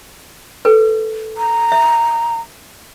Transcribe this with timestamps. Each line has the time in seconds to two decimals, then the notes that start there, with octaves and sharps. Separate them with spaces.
0.65 A4 B4
1.38 A#5
1.72 E5